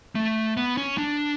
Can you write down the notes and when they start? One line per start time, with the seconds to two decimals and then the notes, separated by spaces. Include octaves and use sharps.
0.15 A3
0.57 B3
0.77 C#4
0.98 D4